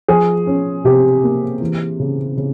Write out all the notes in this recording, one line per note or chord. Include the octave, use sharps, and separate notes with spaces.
F3 G#4
C#4
C3 G4
A#3
E3
C#3
C#3